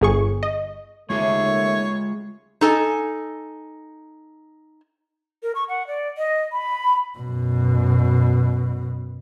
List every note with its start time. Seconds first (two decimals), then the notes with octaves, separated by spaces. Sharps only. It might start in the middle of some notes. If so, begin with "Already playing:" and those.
0.01 G1 G#4 C#6
0.43 D#5
1.10 D#2 G#3 A3 F4 G#4 C#5 E5
2.61 D#4 A4 G#5
5.43 A#4
5.55 C#6
5.69 F#5
5.87 D5
6.17 D#5
6.52 B5
7.18 F#2 B2